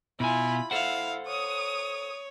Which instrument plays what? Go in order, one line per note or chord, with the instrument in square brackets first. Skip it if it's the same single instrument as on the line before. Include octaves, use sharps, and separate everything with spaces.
[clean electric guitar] B2 G#5 [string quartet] E4 F4 [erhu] B5
[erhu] E4 [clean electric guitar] A4 C5 F#5 [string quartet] F5
[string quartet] C#5 [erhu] D#6